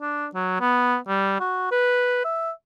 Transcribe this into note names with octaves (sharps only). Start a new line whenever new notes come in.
D4
F#3
B3
G3
F#4
B4
E5